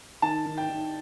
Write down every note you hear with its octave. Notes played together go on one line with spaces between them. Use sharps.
D#3 A5
D#3
G5
D#3